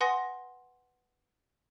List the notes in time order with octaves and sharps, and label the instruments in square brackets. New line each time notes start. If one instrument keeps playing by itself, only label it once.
[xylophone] B4 F#5 G#5 C6 D#6 A#6